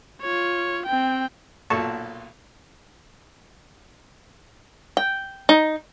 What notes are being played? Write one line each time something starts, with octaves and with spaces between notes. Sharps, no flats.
F4 C#5
C4 G5
B1 A#2 F#4 A4 A5 C#6
G5
D#4